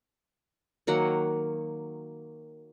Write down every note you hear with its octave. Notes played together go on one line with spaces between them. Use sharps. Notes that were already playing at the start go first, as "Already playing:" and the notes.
D#3 F#3 A#3 F#5